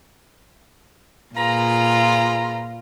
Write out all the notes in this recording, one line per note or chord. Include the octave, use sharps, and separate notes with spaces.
A#2 F4 G#4 B4 A#5